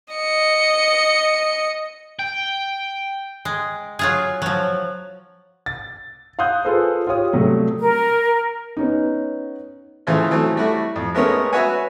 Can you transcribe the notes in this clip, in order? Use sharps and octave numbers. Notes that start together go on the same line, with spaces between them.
D#5 C#7
G5
G#3
F#3 F4 G#4
F3 F#3
A6
F5 F#5 C6 D#6 F#6 G6
F4 G#4 A4 B4 C5
F4 G4 C#5 D#6
C3 F#3 G3 A3
A#4
B3 C#4 D#4
C#3 E3 F3 A3
E3 F#3 A3 C4
G3 A3 E4 F#4
F2
G#3 A3 B3 C#4 A#4 C#5
F#4 B4 C#5 E5 F#5 G#5